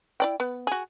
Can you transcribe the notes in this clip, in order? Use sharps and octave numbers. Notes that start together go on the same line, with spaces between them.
E4 D5 G5
B3
F#4 G#4